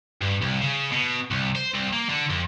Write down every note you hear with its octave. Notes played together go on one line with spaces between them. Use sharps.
G2
C2
C#3
B2
C2
C5
C2
A#3
D3
F2